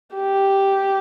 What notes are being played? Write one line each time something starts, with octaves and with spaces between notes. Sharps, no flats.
G4